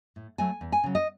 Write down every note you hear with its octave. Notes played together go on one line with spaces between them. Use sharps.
A2
F#3 A3 G#5
E2
G#5
C#3 F#3
D#5